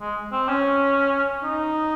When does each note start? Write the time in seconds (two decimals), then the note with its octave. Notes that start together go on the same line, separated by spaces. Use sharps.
0.01 G#3
0.32 C4
0.49 C#4
1.44 D#4